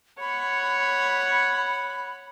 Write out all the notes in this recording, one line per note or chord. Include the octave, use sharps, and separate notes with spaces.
C#5 F#5 B5